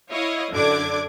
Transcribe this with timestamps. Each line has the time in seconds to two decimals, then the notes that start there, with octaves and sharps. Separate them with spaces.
0.11 E4 C#5 D#5 F5
0.52 F#2 D3 D4 D6 G#6